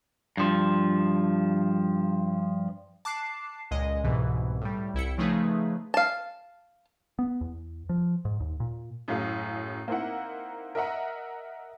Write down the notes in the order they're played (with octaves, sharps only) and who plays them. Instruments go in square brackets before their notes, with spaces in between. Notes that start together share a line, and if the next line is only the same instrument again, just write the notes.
[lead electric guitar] G2 F3
[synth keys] A5 D6 F#6 C7
C#2 A#2 G#3 D#5
C2 G#2 B2 E3
A2 G3
C2 E4 G5 C#7
C#3 F3 A3 D#4 G#4 B4
[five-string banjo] F5 A5
[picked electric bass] B3
E2
F3
G#2
D#2
A#2
[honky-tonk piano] F#2 A2 G#4 F5 D#6
A#3 C4 D#4 E4 F#5
A#4 D#5 E5 F#5 A#5